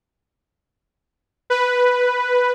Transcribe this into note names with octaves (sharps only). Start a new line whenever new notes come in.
B4